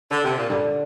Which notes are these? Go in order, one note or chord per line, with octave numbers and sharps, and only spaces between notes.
D3
C3
A#2
G2 D3